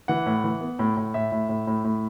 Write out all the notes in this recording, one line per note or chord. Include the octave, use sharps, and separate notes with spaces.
E3 F#5
A2
E3
B3
A2
A2
A2 E5
A2
A2
A2
A2